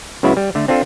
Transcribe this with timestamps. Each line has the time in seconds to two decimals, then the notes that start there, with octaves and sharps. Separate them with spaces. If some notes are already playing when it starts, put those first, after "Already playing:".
0.23 C#2 C#3 F#3 B3 E4
0.37 G3
0.55 D3 A3
0.68 C4 D4 F4 A4